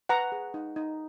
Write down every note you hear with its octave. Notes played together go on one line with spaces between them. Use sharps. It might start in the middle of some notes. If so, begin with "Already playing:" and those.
B4 F#5 A#5
G#4
D#4
D#4